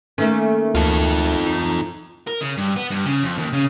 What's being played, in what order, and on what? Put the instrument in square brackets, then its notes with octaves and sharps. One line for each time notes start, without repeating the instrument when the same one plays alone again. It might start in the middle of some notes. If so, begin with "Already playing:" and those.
[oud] D#3 A3 A#3 [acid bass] C#4
[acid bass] D2 [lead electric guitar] F4 A4
[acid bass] D#4
[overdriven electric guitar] A#4
C#3
G2
B3
G2
C#3
F2
D#2
C#3